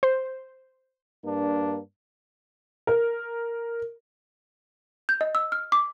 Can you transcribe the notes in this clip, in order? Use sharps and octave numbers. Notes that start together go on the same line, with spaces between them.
C5
G2 A#3 D4
A#4
G6
D#5
E6
F6
D6